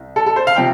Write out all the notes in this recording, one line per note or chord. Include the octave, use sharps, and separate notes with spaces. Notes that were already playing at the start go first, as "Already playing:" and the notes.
Already playing: C2
A4
A4
C5
F5
C3 F3 G5